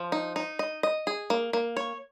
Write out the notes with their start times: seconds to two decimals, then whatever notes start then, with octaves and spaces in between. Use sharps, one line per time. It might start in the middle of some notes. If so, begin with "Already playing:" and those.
Already playing: F3
0.12 D#4
0.36 D#4
0.59 D#5
0.83 D#5
1.07 G#4
1.30 A#3
1.53 A#3
1.77 C#5